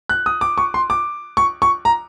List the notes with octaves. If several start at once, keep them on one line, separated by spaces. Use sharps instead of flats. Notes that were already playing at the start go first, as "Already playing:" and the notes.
F#6
D#6
D6
C#6
C6
D6
C#6
C#6
A#5